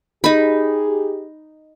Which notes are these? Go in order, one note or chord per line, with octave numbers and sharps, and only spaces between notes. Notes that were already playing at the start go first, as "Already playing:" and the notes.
D#4 G4 G#4 B5